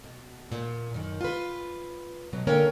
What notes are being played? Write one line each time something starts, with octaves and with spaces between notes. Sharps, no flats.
B2
A#2
F#2 D#3
F4 B4
B2 F#3
D3 A#3 C#4 A#4 C#5 G5